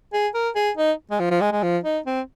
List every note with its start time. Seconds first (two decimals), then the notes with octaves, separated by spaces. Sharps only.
0.13 G#4
0.34 A#4
0.55 G#4
0.77 D#4
1.11 G#3
1.20 F3
1.31 F3
1.41 G#3
1.52 G#3
1.63 F3
1.84 D#4
2.06 C4